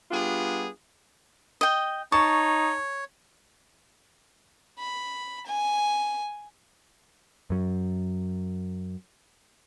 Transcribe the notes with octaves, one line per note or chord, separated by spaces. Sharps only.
G3 B3 D4 F4 G#4
D#5 G5
D#4 C#5 A5 C#6
B5
G#5
F#2 F#3